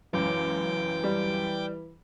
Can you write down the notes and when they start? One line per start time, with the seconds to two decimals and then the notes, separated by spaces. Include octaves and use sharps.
0.13 C#2 F#2 E3 G5 D6
1.04 G3